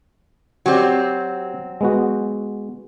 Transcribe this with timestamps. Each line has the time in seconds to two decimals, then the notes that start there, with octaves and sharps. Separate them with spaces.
0.66 F#3 C4 F#4 G4 D5
1.81 G#3 B3 F#4